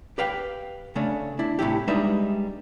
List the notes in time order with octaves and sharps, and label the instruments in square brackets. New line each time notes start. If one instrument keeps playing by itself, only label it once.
[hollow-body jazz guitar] G4 B4 F5 G5
C#3 A3 C#4 D4
D4 E4
A2 C3 F3 E4 G4
G3 G#3 D4 D#4 B4 E5